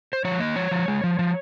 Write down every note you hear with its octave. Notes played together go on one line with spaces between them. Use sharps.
C5
F3 C#5
A#3 D#5
F3 C#5
F3
G#3
F3
F3